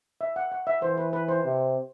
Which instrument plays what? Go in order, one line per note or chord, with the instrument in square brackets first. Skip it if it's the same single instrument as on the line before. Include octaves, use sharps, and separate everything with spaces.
[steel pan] E5
F#5
F#5
E5
[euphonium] E3 [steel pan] C5
[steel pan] B4
B4
C5
[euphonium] C3